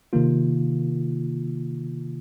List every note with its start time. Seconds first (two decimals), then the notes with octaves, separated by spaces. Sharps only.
0.13 C3 D#3 A#3 F4